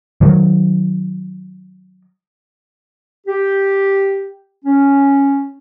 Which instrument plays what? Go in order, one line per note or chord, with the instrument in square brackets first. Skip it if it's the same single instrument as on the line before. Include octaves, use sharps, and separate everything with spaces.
[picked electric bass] D#3 F#3
[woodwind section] G4
C#4